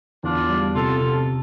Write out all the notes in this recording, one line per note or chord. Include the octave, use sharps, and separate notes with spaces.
E2 D4 F4
G3
C3 F4 A4
C3